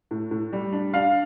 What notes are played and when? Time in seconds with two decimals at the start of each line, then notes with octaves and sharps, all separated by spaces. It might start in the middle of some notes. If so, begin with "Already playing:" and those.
0.11 A2
0.31 A2
0.53 G3
0.72 D4
0.93 D4 F5